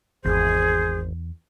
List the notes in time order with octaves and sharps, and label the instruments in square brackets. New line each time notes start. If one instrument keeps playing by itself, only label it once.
[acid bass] G#1 [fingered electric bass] E2 [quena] G#4 [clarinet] C5